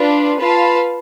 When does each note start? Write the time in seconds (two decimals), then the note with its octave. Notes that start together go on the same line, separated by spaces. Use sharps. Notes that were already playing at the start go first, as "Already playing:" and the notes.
Already playing: D4 F4 B4
0.38 F4 B4 F5 A5